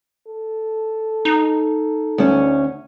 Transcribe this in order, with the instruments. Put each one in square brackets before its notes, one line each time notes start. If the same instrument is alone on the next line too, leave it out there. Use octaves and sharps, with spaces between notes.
[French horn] A4
[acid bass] D#4
[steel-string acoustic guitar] D2 C#4